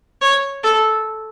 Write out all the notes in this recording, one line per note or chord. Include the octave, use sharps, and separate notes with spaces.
C#5
A4